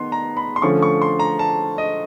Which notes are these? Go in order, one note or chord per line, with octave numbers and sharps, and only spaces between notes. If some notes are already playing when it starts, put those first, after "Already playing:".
Already playing: D#3 B3 C6
A#5
B5
C6
D3 F3 A3 C#4 C#6
C#6
C6
A#5
A5
D#5